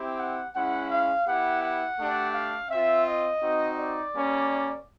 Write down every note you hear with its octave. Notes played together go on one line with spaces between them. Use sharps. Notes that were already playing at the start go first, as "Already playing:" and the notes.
Already playing: C4 E4 G4
F#5
G#3 C#4 E4 F#5
F5
B3 E4 G4 F#5
F#5
A3 D4 G4
F5
C4 F4 E5
D#5
C4 D#4 F#4
D5
G3 A#3 C#4